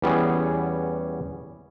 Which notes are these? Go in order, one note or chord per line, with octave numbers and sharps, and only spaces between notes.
E2 G3 B3 C#4 G#4